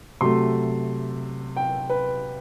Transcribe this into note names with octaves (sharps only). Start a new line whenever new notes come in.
C3 F#3 A3 C6
G5
B4